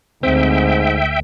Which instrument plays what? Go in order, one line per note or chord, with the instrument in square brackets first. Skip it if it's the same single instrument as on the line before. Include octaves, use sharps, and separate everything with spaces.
[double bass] D2 [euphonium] G#2 [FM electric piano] C4 [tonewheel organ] E5 G5